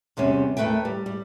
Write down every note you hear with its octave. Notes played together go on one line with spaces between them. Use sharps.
E2 C3 G3 C#4
D#2 A3 B4 E5 G5
G3
G3